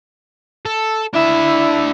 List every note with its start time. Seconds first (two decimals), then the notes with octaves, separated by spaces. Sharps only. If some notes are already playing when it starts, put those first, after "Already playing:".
0.66 A4
1.14 D4 E4 E5